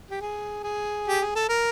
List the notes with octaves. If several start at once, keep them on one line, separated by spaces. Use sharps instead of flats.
G4
G#4
G#4
G4
G#4
A4
A#4